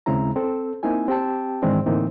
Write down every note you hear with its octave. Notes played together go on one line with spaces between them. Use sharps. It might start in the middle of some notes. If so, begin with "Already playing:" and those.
D#2 C#3 G#3 C4 E4 A#5
C4 A4
A#3 C4 D#4 E4 G#5
C4 G4 G5 A5
G#2 D#3 E3 G#3 C4 D4
A2 D3 E3 A#3 C4 D#4